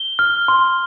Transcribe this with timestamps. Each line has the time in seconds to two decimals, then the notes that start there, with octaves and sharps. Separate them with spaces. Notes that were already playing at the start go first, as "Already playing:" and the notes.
Already playing: G7
0.19 F6
0.48 C6